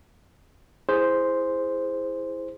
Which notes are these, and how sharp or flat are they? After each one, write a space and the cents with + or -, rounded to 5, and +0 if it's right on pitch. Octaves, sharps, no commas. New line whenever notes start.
E4 +0 G#4 -5 C5 +0